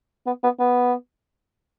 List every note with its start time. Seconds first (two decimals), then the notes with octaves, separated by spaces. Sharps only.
0.26 B3
0.44 B3
0.59 B3